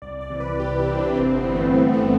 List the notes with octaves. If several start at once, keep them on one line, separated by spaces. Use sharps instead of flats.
C2 D5
D5
C3 E3
B4
C2 G4
E4
C3 E3 C4
D4
G1 C4
B3
G2 E3
A3
G1 A3
B3